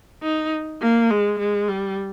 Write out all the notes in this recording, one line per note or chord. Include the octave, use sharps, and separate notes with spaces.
D#4
A#3
G#3
G#3
G3